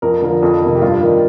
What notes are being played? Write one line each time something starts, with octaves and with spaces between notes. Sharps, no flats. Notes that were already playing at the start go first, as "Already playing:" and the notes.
F2 A#4
D3 F3 A#4
F2 A4
C3 D#3
G4
G2 F4
D#3